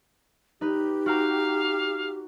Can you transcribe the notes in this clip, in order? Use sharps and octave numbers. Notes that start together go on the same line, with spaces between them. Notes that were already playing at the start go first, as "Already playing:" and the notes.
D#4 G4 B4
F#4 F5 G5 A#5